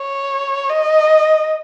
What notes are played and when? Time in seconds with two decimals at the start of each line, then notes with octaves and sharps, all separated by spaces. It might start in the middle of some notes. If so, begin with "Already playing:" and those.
Already playing: C#5
0.69 D#5